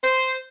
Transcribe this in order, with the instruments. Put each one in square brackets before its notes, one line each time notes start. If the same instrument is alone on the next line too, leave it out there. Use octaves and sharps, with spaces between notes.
[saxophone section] C5